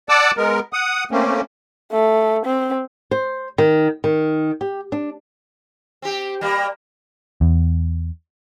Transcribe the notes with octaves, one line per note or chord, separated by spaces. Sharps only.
D5 F#5 A5 D6 E6
G#3 B3 A#4
F#5 D#6
A3 A#3 C4 C#4
A3
C4
C5
D#3
D#3
G4
D4
C4 G4
G3 A#3
E2